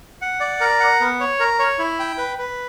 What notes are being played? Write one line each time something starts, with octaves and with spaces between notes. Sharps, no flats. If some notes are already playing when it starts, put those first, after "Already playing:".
F#5
D5
A#4
F#5
B3
C#5
A#4
C#5
E4
G5
B4
B4